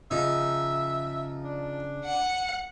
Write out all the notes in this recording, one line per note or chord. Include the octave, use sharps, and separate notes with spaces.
C#3 F3 D#4 E5
D4
F#5